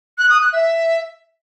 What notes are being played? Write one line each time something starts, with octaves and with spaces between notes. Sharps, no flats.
F#6
D#6
F#6
E5